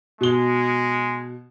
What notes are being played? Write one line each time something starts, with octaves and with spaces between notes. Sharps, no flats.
B2 G#3 G7